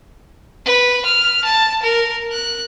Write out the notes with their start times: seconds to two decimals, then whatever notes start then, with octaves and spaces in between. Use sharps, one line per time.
0.65 B4
1.05 F6
1.44 A5
1.82 A#4
2.31 F#6